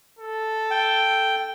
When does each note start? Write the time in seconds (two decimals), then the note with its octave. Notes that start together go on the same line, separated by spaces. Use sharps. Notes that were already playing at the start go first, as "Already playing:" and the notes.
0.19 A4
0.71 G5